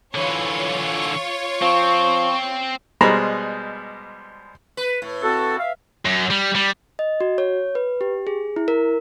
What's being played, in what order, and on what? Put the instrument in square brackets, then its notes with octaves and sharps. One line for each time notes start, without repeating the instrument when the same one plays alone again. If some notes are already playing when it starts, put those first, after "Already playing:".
[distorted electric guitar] D3 E3 [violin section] F4 C#5
[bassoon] F3 [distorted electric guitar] C4 [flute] C#6
[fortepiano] B2 G3 G#3 C5 A#5 B5
[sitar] B4
A2
[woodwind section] C4 F#4 A4
E5 F5
[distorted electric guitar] F#2
G3
G3
[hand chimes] D#5
F#4
C#5
B4
G4
G#4
E4
A#4